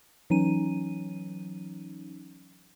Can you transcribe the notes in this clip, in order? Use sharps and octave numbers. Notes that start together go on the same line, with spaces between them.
E3 F#3 C#4 D#4 D#7